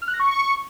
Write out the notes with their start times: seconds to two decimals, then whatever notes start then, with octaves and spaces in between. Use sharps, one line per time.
0.02 F6
0.08 F#6
0.14 A#6
0.20 C#6